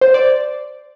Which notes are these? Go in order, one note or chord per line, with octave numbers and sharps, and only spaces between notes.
C5
D5